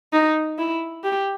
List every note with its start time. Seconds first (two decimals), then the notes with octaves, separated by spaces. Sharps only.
0.13 D#4
0.59 E4
1.04 G4